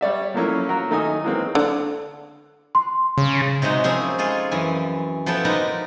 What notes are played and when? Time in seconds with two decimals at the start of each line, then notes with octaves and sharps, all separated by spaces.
0.01 G3 C#5 D5 E5
0.34 F3 F#3 A3 A#3 C#4 E4
0.69 F#3 F#4 A#4
0.90 D#3 A3 D#4 G#5 D#6
1.23 E3 F#3 G#3 A#3 C4
1.55 D3
2.75 C6
3.18 C#3
3.62 C3 F#3 G#3 D#4 F#4
3.84 F3 A#3 C4 C#4 E4 G#4
4.19 G#3 F4 G#4 A4 G#5
4.51 F#2 E3 G#5
5.26 F3 B3 E4 A4 G5
5.45 G#3 D#4 A#4 B4 D5 D#5